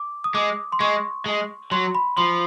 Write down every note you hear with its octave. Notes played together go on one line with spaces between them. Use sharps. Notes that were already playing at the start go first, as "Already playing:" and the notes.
Already playing: D6
D#6
G#3 D6
C6
G#3 C#6
G#3
F#3 C6
B5
F3 C6